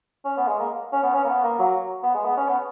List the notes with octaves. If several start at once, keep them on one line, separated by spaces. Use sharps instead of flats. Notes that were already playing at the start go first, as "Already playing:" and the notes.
C#4
B3
G#3
A#3
C#4
B3
C#4
A#3
B3
A#3
F#3
B3
G#3
B3
C#4
B3